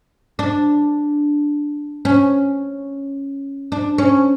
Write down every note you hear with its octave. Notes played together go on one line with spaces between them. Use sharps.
D4
C#4
D4
C#4